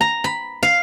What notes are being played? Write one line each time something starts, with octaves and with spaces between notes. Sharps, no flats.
A#5
B5
F5